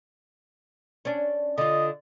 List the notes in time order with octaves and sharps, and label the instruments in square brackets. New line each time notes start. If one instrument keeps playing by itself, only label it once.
[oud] C#4 D4
[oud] D3 F4 [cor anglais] D#5